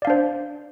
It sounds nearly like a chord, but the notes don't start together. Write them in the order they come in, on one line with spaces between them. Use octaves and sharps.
D5 F5 D4 C5